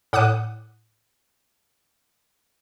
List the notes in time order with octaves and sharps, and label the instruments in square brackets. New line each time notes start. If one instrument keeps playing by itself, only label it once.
[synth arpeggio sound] A2 F#5 D6 D#6 F#6 D#7